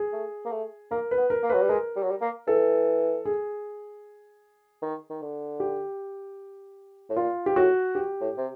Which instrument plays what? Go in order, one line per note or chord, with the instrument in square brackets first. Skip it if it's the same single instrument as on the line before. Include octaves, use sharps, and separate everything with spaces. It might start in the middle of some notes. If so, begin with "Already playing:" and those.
Already playing: [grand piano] G#4
[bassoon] A3
A#3
A3
[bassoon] A#3 [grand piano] A#4
[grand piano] B4
[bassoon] B3
[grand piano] A#4
[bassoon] A#3
[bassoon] F#3 [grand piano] B4
[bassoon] G3
[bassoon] G#3 [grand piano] A#4
[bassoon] G3
F#3
G3
A#3
[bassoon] E3 [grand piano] A4
[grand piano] G#4
[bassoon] D#3
D#3
D3
[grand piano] G4
[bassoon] A2
[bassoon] A#2 [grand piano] F4
[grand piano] G4
[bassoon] A2 [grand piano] F#4
[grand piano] G4
[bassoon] A2
C3